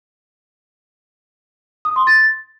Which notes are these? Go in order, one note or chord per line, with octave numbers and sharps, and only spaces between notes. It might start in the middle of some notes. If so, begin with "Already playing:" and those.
D#6
C6
A6